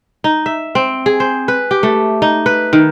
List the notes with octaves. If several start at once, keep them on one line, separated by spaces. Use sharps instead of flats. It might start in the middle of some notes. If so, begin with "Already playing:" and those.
D#4
E5
C4
G#4
C5
B4
G4
A3
D#4
B4
D#3